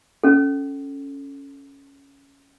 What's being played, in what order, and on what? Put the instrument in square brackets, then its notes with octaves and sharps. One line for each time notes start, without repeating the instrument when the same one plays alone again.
[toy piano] C#4 A4